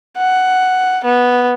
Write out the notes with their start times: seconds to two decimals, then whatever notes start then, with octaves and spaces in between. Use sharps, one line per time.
0.17 F#5
1.05 B3